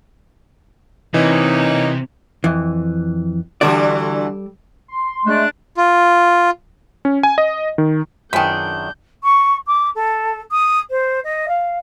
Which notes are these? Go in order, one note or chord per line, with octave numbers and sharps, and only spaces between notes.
C3 E3 A#3 C#4 D#4
F2 E3
D3 E3 G3 F#4 A4 D5
C6
G#3 A3 D4 D5 F#6
F4
C#4
G#5
D#5
D#3
F#2 D#3 B3 D4 F4 G#4 G5 G6
C#6
D6
A4
D#6
C5
D#5
F5